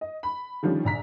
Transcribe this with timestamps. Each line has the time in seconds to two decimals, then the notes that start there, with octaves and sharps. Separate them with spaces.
0.01 D#5
0.23 B5
0.63 D3 D#3 F3 G3 C#4
0.85 A#1 A#5 B6